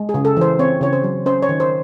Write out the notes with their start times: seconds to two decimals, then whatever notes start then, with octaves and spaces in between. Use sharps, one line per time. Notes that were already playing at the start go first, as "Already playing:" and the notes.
Already playing: G#3
0.09 G#4
0.14 C#3
0.25 A4
0.37 E3 C5
0.59 C4 C#5
0.81 C#3 C#5
0.93 C5
1.04 F#3
1.26 C#4 C5
1.42 C#5
1.49 D#3
1.60 C5